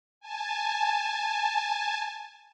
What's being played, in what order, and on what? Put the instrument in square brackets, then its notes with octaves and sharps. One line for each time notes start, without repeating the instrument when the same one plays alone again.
[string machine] G#5 A5